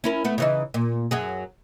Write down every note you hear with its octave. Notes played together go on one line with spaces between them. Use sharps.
C#4 E4 A#4
A3 B3
C#3 E3 D#4
A#2
F#2 F#3 G#4